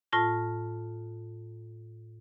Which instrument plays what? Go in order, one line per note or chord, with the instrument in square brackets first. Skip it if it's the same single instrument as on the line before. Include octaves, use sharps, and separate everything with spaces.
[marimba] A2 F4 A5 A#6